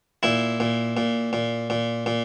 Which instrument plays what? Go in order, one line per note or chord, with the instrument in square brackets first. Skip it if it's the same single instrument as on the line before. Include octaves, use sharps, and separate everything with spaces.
[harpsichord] A#2 E4
A#2
A#2
A#2
A#2
A#2